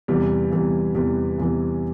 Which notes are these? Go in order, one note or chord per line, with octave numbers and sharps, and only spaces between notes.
E2 C3 E3 G3
E2 C3 E3 G3
E2 C3 E3 G3
E2 C3 E3 G3